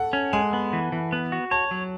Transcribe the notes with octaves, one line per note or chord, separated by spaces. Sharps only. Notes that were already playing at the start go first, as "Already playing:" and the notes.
Already playing: A4 F#5
C#4
G#3 G#5
B3
E3
E3
B3
F#4
C#5 A5
F#3